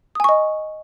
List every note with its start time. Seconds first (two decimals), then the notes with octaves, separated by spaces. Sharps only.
0.15 D#6
0.20 G#5
0.24 C#6
0.29 D#5